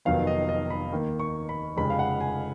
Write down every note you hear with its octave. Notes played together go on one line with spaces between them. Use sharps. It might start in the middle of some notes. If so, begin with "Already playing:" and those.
F1 F2 D#3 F#3 B3 F5
D#5
D#5
B5
D#2 D#3 A#3
C#6
B5
F1 F2 C#3 G#3 B5
F5
F#5
G#5